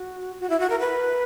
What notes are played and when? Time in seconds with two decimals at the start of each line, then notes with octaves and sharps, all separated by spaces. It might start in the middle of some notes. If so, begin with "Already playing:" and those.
Already playing: F#4
0.40 F#4
0.50 E4
0.60 F#4
0.70 A#4
0.80 B4